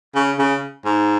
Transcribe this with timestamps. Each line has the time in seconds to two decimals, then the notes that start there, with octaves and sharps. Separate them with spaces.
0.16 C#3
0.39 C#3
0.85 G#2